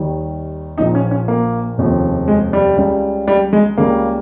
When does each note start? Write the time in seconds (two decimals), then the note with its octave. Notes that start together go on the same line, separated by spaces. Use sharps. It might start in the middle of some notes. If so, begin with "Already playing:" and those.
Already playing: D#2 D#3 G3
0.78 A#1 A#2 F3 D#4
0.95 C#4
1.11 C#4
1.28 A#3
1.78 F1 D#2 C#3 F3
2.28 G#3
2.53 G3
2.77 C#2 C#3 G3
3.28 G3
3.53 G#3
3.78 C#2 C#3 G3 A#3